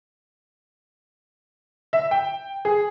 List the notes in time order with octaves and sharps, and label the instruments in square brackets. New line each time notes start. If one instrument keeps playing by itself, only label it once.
[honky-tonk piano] E5
G5
G#4